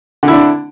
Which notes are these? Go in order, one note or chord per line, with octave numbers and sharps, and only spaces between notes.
D3 D4 E4